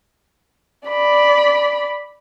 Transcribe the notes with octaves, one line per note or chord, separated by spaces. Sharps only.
D5 B5